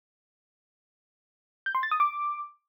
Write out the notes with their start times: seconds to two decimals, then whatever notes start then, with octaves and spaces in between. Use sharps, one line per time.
1.66 G6
1.75 C6
1.83 A6
1.91 D#6
2.00 D6